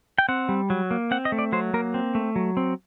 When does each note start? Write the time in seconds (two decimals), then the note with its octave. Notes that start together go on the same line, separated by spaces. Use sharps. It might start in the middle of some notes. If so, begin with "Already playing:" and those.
0.18 G5
0.29 C4 F#5
0.49 G3
0.70 F#3
0.91 A#3
1.11 C4 F#5
1.25 D#5
1.32 A3
1.39 D5
1.52 F#3 C5
1.74 A#3 A#4
1.94 C4
2.15 A3
2.36 F#3
2.57 C4